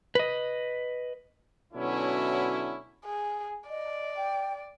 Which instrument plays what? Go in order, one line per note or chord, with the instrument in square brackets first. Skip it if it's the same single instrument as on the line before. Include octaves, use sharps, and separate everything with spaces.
[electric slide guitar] B4 D#5
[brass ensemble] B2 D3 F#3 C#4 E4
[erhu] G#4
[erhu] D5 [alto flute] D#5
[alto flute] G5